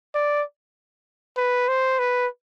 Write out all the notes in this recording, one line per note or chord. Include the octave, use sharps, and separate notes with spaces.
D5
B4
C5
B4